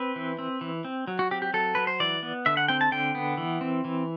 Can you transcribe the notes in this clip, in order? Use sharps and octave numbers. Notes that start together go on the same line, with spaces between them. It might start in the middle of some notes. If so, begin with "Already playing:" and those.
Already playing: C4 B4
E3
C4
E3
C4
F#3
F#4
C4 G4
G4
F#3 A4
F#3 B4
C5
E3 D5
B3
D3 E5
F#5
C4 G5
A5
D3 G5
B3
E3
C4
E3